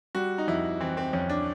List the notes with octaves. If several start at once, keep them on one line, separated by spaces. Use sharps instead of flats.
G3 F#4
D#4
F2 E4
E3 C4
C4
F2 C#4
D4